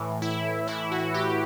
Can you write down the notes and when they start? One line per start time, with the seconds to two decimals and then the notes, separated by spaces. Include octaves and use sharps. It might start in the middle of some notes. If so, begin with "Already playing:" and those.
Already playing: A2 E3
0.22 E4
0.67 A2 E3 E4
0.91 F#4
1.14 G4